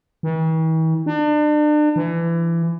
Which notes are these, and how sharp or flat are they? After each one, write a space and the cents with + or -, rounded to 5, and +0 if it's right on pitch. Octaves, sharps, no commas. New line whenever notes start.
E3 -45
D4 +35
E3 +25